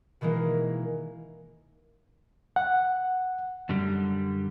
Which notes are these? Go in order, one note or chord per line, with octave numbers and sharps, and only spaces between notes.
B2 D#3 E3 G#3 A#3
F#5
F#2 D3 G3